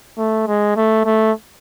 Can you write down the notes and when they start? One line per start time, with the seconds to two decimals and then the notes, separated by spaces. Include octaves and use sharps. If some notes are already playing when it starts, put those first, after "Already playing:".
0.18 A3
0.48 G#3
0.77 A3
1.05 A3